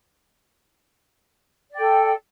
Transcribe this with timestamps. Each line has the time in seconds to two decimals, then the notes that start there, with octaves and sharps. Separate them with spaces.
1.71 D5
1.75 G5
1.78 A4